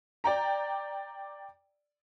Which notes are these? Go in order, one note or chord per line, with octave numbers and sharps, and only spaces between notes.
D5 G5 A#5